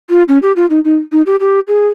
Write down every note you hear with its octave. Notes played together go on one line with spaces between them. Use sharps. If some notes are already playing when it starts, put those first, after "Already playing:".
F4
C#4
G4
F4
D#4
D#4
D#4
G4
G4
G#4